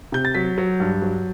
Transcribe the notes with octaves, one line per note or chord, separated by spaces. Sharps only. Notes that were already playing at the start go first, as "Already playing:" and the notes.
C3 G6
A6
F#3 B6
F#3
G2
F#3